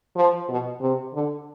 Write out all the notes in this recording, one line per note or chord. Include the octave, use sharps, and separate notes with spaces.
F3
B2
C3
D3